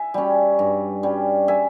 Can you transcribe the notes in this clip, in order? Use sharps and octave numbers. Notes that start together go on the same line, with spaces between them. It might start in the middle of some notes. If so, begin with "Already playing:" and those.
Already playing: E5 G#5
G3 C#4
G2
G3 C#4
E5 G#5